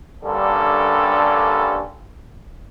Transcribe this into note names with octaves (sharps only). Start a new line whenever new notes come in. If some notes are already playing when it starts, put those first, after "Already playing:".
G2 D3 G3 A#3 C#4 A4